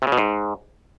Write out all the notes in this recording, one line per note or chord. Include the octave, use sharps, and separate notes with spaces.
C3
C#3
B2
G#2